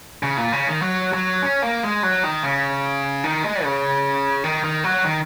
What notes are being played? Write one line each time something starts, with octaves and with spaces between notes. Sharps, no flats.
C#3
A#2
C#3
D#3
F#3
F#3
C#4
A#3
G#3
F#3
D#3
C#3
D#3
G#3
C#3
D#3
D#3
F#3
D#3